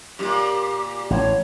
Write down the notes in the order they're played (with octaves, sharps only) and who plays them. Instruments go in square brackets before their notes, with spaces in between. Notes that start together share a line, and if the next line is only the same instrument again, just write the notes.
[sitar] F#2 A#2 [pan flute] G4
[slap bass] A1 [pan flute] C#5